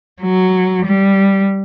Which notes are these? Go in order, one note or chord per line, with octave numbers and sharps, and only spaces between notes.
F#3
G3